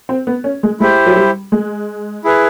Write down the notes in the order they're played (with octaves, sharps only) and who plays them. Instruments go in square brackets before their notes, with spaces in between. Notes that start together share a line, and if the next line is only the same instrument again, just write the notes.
[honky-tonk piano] C4
B3
C#4
G#3
[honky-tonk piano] G#3 [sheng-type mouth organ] E4 G4 C5
[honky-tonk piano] F#3
G3
G#3
[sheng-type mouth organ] E4 G#4 B4